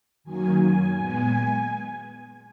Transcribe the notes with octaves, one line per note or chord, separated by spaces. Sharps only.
F#2 D#3 F#3 A#3 G#5
G#5
A#2 G#3 B3 G#5